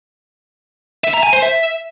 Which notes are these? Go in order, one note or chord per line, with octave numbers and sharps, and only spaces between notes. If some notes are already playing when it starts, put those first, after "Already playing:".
E5
A#5
G#5
C5
E5